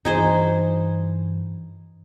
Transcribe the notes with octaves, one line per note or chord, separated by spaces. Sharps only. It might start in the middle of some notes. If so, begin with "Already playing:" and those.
G2 E3 D#4 G#4 C5